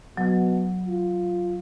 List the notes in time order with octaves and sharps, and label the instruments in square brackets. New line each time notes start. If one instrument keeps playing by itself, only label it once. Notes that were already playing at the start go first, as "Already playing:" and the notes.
[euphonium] B2 [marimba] F#3
[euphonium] F4